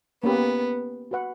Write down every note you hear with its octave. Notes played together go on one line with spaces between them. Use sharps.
A#3 B3 C#4 G4 B4
F#4 B4 F#5